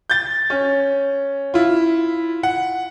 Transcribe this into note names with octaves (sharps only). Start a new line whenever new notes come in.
G6 A6
C#4
E4 F4
F#5